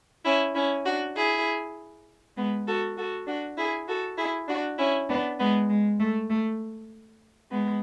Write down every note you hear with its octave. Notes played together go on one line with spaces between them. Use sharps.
C#4 E4
C#4 E4
D4 F#4
E4 G#4
G#3 B3
F#4 A4
F#4 A4
D4 F#4
E4 G#4
F#4 A4
E4 G#4
D4 F#4
C#4 E4
B3 D4
G#3 B3
G#3
A3
A3
G#3 B3